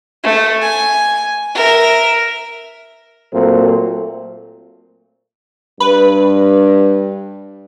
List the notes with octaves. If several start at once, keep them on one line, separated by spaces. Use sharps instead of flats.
A3
G#5
A#4 E5
A#2 F#3 A3 C4
G2 B4